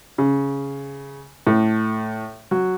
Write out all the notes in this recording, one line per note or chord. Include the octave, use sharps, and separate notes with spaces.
C#3
A2
F#3